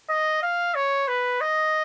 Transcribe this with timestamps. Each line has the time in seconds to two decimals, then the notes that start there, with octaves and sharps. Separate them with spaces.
0.09 D#5
0.43 F5
0.75 C#5
1.08 B4
1.41 D#5